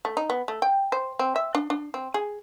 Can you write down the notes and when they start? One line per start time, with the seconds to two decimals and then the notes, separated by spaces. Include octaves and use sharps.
0.05 A3
0.17 D#4
0.30 B3
0.48 A3
0.62 G5
0.92 C5
1.19 C4
1.36 E5
1.55 D4
1.70 D4
1.94 C4
2.14 G#4